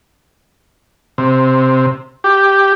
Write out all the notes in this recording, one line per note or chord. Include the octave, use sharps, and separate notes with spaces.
C3
G4